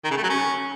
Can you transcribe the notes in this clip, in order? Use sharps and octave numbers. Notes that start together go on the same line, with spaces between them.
D#3
C#3
A3
F#3
C#4